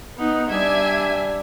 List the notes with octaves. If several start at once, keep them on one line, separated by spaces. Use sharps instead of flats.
B3 D#4
G3 D4 E5 G#5